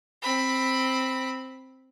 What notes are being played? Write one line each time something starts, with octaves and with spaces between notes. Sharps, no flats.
C4 B5